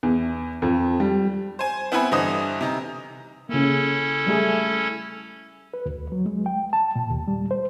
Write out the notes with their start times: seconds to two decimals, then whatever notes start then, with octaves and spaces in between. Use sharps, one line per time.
0.03 E2
0.62 F2
1.00 G3
1.59 C5 G#5
1.92 B3 C4 E4 F#5 G#5 B5
2.11 G2 D3 E3 C5 D#5 D#6
2.61 C3 D#4
3.49 C#3 A#3 C#4 E4 A4
4.27 G3 A3 G#4
5.74 B4
5.86 D2
6.12 F#3
6.26 G#3
6.46 G5
6.73 A5
6.96 A#2
7.10 D#2
7.28 G3
7.51 C5